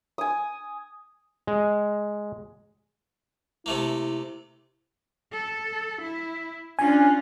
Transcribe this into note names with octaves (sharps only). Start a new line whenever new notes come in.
G#5 D#6
G#3
C3 A3 A#3 E4
A4
E4
C#4 D4 F4 G#5